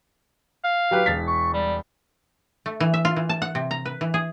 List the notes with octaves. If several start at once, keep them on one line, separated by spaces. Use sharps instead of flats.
F5
F#3 G4 B4
E1 A6 B6
C#6
G3
A3
E3
E5
F4
E3
A5
F#5
C3
A#5
B4
E3
G#4